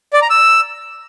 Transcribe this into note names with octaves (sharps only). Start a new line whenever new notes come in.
D5
A#5
E6